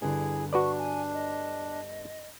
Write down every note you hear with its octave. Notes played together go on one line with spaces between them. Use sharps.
G1 D3 E4 G#4
D4 F#4 B4 D5 C#6
G#5
D#5